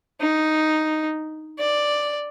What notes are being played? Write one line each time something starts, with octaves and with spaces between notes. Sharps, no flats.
D#4
D5